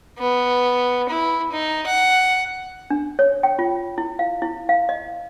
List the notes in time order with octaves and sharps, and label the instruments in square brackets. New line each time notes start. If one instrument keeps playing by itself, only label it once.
[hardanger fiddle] B3
E4
D#4
F#5
[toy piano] D4
C#5
G5
F4
E4
F5
E4
F5
D#5